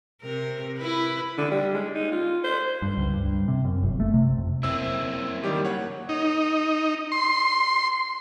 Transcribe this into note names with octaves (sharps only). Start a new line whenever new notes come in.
C3 A#4
E4 B4
D3
G3
G#3
D#4
F4
C5
G2
C#2
G2
C3
F#2
G1
A3
C3
F2
F#3 A#3 C4 E4 E6
D#3 G3 G4
C#5 F#5
D#4
C6